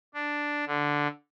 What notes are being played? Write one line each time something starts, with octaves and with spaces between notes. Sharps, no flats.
D4
D3